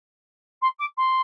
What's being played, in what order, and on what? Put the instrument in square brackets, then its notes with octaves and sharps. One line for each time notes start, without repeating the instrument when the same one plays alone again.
[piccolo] C6
D6
C6